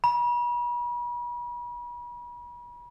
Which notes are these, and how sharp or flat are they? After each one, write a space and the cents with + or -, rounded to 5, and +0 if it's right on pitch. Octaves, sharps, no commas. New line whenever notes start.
B5 -40